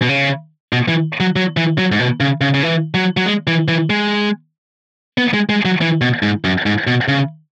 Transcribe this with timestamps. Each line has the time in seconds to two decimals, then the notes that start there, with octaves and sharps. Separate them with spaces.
0.02 B2
0.09 C#3
0.73 B2
0.88 E3
1.20 F#3
1.36 F#3
1.57 E3
1.78 F#3
1.92 G#2
1.99 B2
2.20 C#3
2.41 C#3
2.54 C#3
2.63 E3
2.94 F#3
3.17 F#3
3.26 G#3
3.47 E3
3.68 E3
3.90 G#3
5.18 B3
5.34 G#3
5.49 G#3
5.65 F#3
5.81 E3
6.01 B2
6.23 G#2
6.45 F#2
6.66 G#2
6.87 B2
7.08 C#3